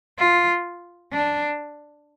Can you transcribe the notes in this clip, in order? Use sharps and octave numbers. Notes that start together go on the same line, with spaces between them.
F4
D4